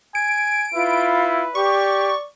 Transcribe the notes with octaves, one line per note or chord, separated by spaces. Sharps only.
G#5 D7
E4 F4 B4
G4 D5 C#6